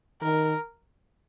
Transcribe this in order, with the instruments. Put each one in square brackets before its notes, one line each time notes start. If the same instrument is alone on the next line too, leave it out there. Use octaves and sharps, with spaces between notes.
[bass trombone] D#3 [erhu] A#4